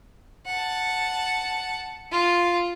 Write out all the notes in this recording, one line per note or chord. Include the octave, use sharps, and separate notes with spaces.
F#5 A5
F4